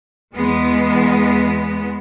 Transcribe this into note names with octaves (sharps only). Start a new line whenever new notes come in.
E2 G#3 B3